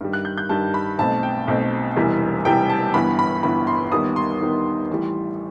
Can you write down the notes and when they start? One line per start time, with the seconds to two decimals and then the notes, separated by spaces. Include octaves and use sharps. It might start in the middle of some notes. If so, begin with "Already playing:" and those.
0.01 G2 D#3 G3
0.13 F#6
0.25 G6
0.38 G6
0.49 G2 D#3 G3 A5
0.74 B5
0.99 B1 B2 A3 C4 A5
1.23 G5
1.48 B1 B2 A3 C4
1.96 E1 E2 C3 E3 G3
2.45 E1 E2 C3 E3 G3 G5
2.70 A5
2.94 G1 G2 E3 B3 B5
3.19 B5
3.43 G1 G2 E3 B3 B5
3.67 C6
3.92 D#2 D#3 G3 B3 D#6
4.16 C6
4.41 D#2 D#3 G3 B3
4.89 A1 A2 E3 G3